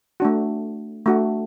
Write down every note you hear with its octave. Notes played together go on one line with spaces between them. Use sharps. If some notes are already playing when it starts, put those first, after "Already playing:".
A3 D4 F#4
A3 D4 F#4